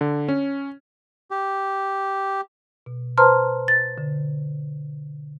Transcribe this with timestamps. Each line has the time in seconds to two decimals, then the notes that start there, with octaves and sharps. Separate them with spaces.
0.01 D3
0.28 C#4
1.31 G4
2.86 B2
3.18 B4 C5 A5 A#5 C6 F6
3.68 A6
3.98 D3